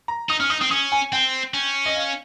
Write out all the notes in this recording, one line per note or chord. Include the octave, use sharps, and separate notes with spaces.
A#5
D#4 D#6
C#4 F6
D#4 D#6
C4 D#6
C#4 D#6
G#5
C4 G5
C#4
D#5
F5